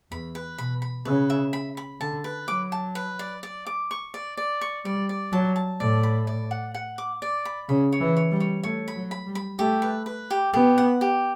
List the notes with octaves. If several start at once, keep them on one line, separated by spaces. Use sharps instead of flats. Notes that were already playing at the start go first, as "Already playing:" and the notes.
E2 B5
B4
B2 B5
B5
C#3 B4
E5
B5
B5
D3 A5
B4
F#3 D6
A5
B4
D5
D5
D6
C#6
D5
D5
C#6
G3 D5
D5
F#3 A5
A5
A2 D5
B5
D5
F#5
F#5
D6
D5
B5
C#3 B5
C#5
E3
C#5
G3
C#5
A3 C#5
B5
F#3
B5
G3
B5
A3 G4
B4
B4
G4
B3 G4
F#5
G4